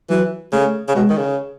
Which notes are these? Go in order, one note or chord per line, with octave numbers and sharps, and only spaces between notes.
E3 F#3
C#3 A3
C#3
B2 G#3
D#3
C#3